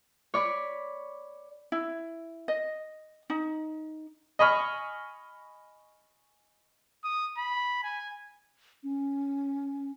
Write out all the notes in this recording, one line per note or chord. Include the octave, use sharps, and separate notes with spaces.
C#5 D5 B5
E4
D#5
D#4
D#5 G#5 B5 C#6 F6
D#6
B5
G#5
C#4